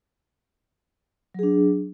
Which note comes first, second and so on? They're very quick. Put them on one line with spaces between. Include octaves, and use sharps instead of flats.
F#3 G#4 D4